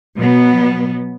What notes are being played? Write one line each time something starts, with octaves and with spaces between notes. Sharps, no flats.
B2 F#3 B3